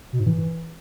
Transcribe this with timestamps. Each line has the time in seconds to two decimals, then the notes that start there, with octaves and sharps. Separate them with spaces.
0.13 B2
0.20 G#2
0.26 E3